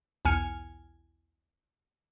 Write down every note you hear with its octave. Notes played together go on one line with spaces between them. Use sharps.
B1 E2 G#5 F6 C#7